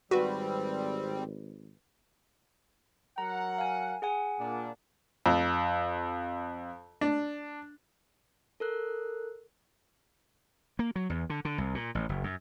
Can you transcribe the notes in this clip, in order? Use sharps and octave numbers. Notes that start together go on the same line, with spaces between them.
G#1 G3 C4 F#4 B4
F#3 A#4 F#5 A#5
F5 G#5
G#4 F#5 G#5
A#2 D4
F2
D4
A4 A#4 F#6
A#3
F#3
E2
D3
D3
C2
A#2
A1
F#1
F#2